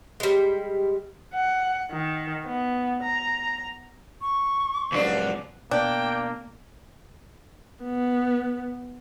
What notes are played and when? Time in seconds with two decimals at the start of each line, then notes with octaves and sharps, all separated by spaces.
0.20 G3 G#3
1.34 F#5
1.92 D#3
2.45 B3
3.02 A#5
4.22 C#6
4.92 C#2 F#2 F3 D4 F#4
5.71 B2 A#3 D4 G5
7.84 B3